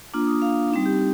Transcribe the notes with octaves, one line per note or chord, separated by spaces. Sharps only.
A#3 D4 F4 D6
D#6
F5
G3 C4 D#4
G4